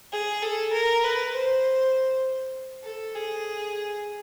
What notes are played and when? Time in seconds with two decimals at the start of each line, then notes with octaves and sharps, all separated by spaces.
0.12 G#4
0.42 A4
0.74 A#4
1.04 B4
1.34 C5
2.84 A4
3.15 G#4